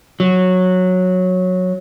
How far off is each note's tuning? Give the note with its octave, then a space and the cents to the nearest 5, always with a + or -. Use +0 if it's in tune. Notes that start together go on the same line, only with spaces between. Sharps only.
F#3 -10